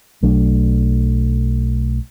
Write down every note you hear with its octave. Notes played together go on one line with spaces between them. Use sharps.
B1 F#3 A3 D4